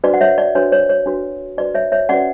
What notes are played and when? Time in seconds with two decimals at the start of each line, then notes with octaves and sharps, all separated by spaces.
0.04 D4 F#4 B4 D5
0.14 F#5
0.21 C#5 E5
0.38 D5
0.55 D4 F#4 B4 C#5
0.72 C#5
0.89 C#5
1.06 D4 F#4 B4
1.57 D4 F#4 B4 D5
1.75 C#5 E5
1.92 C#5 E5
2.09 C#4 F#4 B4 D5 F#5